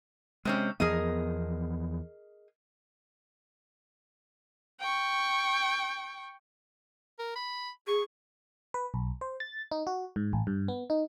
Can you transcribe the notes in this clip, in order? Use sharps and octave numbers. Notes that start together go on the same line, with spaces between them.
C3 G#3 C4 C#4
E2 F3 B3 G#4 A#4 D#5
G5 C#6
A#4
B5
G#4 C#6
B4
B1
C5
A6
D#4
F#4
G#2
A1
G2
B3
D#4